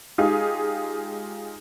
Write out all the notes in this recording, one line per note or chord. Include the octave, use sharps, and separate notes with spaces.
G#3 D#4 F4 G4 G#4